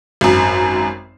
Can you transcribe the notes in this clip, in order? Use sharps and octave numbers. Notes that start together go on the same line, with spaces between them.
G#1 F#2